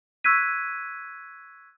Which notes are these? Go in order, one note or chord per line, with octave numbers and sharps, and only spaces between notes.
C#6 E6 F#6 G#6 B6 D#7